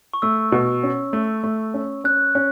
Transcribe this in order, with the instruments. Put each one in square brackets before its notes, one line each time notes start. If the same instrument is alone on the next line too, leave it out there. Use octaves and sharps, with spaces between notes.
[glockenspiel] C#6
[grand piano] A3 [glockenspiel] E6
[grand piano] B2
C#4
A3
A3
C#4
[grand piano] C#4 [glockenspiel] F#6
[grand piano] C#4